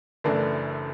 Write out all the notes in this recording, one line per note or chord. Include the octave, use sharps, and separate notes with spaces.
F#1 F#2 E3 A3 D4